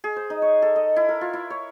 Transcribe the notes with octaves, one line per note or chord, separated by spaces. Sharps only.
G#4
C5
D#4
C#5
A4
D#5
E4
A#4
F4
E4
C#5